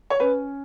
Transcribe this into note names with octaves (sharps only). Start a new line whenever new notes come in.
C#5
C#4 B4